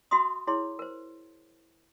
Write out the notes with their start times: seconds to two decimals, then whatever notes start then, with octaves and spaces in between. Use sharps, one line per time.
0.11 F#4 E5 B5 C6 D#6
0.47 E4 G#4 C#5 C6
0.79 A#4 C5